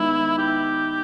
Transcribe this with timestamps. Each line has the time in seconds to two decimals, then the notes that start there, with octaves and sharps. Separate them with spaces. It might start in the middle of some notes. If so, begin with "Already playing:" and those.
Already playing: D#3 G#3 B3 D#4 E4
0.38 G4